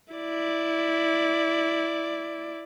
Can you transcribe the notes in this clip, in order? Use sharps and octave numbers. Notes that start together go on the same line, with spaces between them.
E4 D5